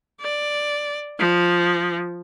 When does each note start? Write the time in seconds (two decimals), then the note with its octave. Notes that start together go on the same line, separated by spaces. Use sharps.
0.20 D5
1.19 F3